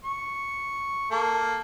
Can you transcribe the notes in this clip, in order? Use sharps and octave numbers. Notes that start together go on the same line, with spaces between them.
C#6
A#3 A4